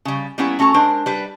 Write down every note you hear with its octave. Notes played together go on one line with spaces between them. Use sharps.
C#3 G3
G3 A#3 B3 C#4 E4
A3 C#4 F#4 A4 A#5
G#3 D4 A#4 C5
G3 B4